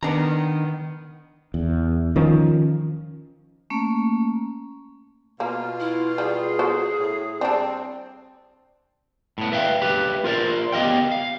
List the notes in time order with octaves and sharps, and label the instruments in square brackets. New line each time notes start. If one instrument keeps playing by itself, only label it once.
[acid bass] D#3 [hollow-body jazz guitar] B3 D4 A#5
[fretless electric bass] E2
D#3 F3 C#4
[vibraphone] A3 A#3 C#4
[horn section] B2 F4 [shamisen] A#3
[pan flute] E4
[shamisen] G3 [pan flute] G#4
[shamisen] F#4 A4 C5
[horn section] A2
[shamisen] G3 D4 [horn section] C4
[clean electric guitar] A2 B3
B4 E5 F5 G5
G4 B4 E5
F4 A#4 C5 D5
B3 G4 D#5 F5 G5
F5